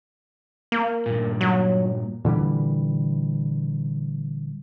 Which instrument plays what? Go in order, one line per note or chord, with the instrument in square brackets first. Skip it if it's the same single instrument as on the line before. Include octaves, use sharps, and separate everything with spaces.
[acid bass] A#3
[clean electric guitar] G2 A#2
[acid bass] F#3
[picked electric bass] A#2 D3 E3 G3